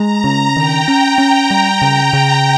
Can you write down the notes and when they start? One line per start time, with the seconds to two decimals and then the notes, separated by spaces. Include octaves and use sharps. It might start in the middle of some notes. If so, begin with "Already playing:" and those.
Already playing: G#3 A#5
0.24 C#3
0.56 D#3 G5
0.88 C#4
1.18 C#4
1.50 G3
1.82 C#3
2.13 C#3